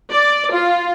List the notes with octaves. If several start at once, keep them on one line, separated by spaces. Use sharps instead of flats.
D5
F4